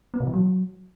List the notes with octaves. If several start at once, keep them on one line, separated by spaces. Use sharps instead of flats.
B3
B2
E3
F#3